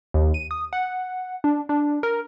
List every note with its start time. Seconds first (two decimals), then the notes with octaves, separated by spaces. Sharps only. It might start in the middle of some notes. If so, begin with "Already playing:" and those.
0.14 D#2
0.34 D#7
0.51 D#6
0.73 F#5
1.44 D4
1.69 D4
2.03 A#4